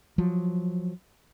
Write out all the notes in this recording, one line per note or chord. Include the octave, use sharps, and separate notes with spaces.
F3 F#3